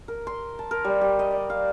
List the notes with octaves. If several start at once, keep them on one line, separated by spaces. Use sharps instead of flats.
A#4
C6
A5
A#4
G3
G4
D#5
D5
F5